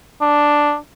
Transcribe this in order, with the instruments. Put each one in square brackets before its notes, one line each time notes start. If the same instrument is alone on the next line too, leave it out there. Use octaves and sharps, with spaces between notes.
[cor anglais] D4